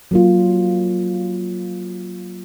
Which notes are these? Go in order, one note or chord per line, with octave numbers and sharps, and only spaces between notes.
F#3 A#3 F4